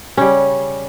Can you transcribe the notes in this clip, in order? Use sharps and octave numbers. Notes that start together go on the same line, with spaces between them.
C#3 G3 C#4